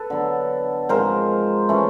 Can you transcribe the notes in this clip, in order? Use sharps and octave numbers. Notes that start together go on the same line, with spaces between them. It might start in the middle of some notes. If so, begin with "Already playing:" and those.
Already playing: A4 B4
D3 F#3 B3
G#2 F3 G#3 C4 A#4 C5
E3 A3 C#4